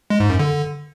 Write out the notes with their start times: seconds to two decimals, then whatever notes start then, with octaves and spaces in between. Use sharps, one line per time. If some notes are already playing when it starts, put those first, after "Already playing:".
0.10 G#3
0.20 G#2
0.30 F#2
0.39 D3